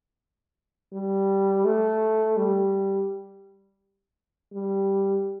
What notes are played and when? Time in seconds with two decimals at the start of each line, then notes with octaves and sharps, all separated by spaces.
0.93 G3
1.65 A3
2.37 G3
4.53 G3